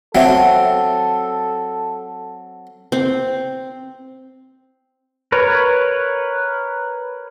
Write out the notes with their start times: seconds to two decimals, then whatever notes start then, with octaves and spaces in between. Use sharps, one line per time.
0.15 F#3 C4 A4 E5 F#5
2.92 C4
5.32 A#4 B4 C#5